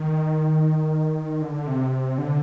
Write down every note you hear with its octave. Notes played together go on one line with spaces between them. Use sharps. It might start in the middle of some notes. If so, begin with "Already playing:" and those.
Already playing: D#3
D3
D3
C3
D3